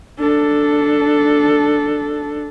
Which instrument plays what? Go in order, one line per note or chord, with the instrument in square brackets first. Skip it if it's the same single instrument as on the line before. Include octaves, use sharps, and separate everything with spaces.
[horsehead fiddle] D4 A4